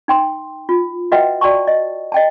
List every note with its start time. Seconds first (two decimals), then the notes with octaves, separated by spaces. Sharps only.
0.08 D#4 G5 C6
0.69 F4
1.12 F#4 B4 D#5 E5 F#5 G5
1.41 F#4 D5 G5 A5 C#6
1.67 D#5
2.12 D#5 G5 A5